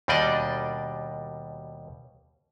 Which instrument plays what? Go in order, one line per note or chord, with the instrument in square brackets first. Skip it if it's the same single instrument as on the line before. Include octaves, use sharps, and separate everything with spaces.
[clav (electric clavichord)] D#2 B2 G3 D4 D5 D#5